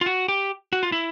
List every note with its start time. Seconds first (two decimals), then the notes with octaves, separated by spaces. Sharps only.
0.01 F4
0.06 F#4
0.28 G4
0.73 F#4
0.83 F4
0.92 E4